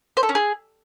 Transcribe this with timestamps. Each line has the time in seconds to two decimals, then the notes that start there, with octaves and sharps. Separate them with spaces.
0.17 C5
0.23 A4
0.29 C#4
0.35 G#4